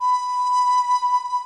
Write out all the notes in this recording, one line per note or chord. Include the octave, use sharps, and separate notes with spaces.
B5